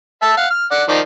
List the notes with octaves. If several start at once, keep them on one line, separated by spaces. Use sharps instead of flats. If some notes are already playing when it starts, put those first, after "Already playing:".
E5 A5
F5 F#5
F6
D5 F#5
D#3 F3 D5